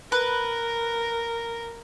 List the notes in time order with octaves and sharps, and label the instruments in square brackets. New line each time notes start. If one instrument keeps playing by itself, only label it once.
[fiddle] A#4 [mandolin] B4